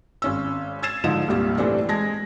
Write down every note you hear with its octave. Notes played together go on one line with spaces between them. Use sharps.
G#1 C#4 E6
E6 G#6 A6 C7 E7
G#2 D3 F3 D#4 E7
C2 G2 A#2 G3 G4
A2 E3 G3 C4 D4 A4
G#3 A5 G#6 A#6